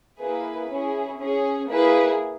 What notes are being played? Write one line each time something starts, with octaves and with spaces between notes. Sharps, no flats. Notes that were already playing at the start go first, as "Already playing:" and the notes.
A#3 E4 G#4 B4
C#4 E4 G#4
C#4 G#4
A#3 E4 G#4 B4